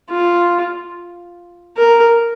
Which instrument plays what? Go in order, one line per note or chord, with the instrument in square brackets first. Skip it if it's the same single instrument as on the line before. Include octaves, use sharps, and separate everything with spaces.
[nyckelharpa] F4
A#4